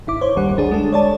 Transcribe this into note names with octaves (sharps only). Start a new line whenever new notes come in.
G#1 E4 D6
C5 C#5
G1 D#2 G3 F#5
D2 D4 G#4
G#3 D4 A4
C#5 D5 A5